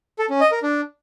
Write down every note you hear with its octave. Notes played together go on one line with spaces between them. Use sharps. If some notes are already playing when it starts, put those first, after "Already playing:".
A4
C#4
D#5
A#4
D4